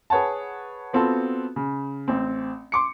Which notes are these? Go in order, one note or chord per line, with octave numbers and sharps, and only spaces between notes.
G#4 B4 C#5 F#5 A5
B3 C4 F4 F#4 A4
C#3
A1 C4
C6 D6 C#7